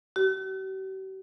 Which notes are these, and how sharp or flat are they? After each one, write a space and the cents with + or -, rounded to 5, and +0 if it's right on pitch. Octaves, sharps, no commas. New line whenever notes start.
G4 -45